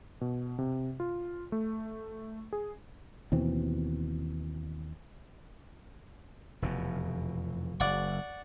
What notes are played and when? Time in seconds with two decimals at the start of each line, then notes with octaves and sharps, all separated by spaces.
0.21 B2
0.59 C3
1.00 F4
1.52 A3
2.53 G#4
3.32 D#2 B2 E3 C4
6.62 F1 E2 B2
7.80 F#1 D5 F#5 C#6